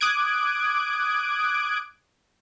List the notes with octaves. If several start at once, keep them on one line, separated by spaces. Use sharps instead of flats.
D6 D#6 F#6 G#6 D7